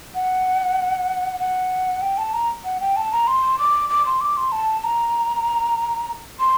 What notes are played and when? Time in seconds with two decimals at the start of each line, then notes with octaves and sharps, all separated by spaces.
0.15 F#5
1.40 F#5
2.02 G5
2.18 A5
2.34 A#5
2.65 F#5
2.81 G5
2.96 A5
3.12 A#5
3.27 C6
3.59 D6
3.90 D6
4.06 C6
4.21 D6
4.37 C6
4.52 A5
4.84 A#5
6.39 C6